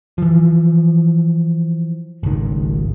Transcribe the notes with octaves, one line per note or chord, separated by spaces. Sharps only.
E3 F3
G#1 C#2 D#3